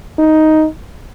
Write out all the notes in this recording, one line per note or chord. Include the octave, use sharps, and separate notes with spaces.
D#4